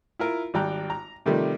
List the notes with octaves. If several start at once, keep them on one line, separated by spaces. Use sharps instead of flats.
E4 F4 A#4
G#1 G3 D5 G5 A#5 F#6
A#5
C3 D#3 F3 G3 A3